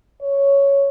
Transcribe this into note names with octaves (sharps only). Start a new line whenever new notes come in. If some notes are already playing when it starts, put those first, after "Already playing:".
C#5